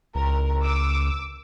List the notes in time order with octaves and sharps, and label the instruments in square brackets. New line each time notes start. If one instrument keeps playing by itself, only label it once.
[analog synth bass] C#2 [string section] A#4
[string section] D6 E6